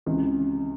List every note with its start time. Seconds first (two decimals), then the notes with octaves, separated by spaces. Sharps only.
0.06 C#2 C3 E3